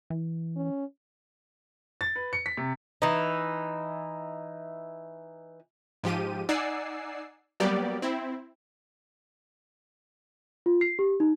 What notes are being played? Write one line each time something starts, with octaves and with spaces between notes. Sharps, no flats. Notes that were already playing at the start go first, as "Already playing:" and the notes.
E3
C#4
A6
B4
C#7
B6
C3
E3 D#4
G#2 F3 G4 D#7
D#4 D5 F#5 G#5 E6 C7
F#3 G3 A#3 B3 G4 D5
C4 E4
F4
C7
G4
D#4